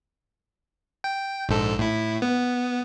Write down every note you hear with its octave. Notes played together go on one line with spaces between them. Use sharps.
G5
A#1 G#2 A4
A2 E4
B3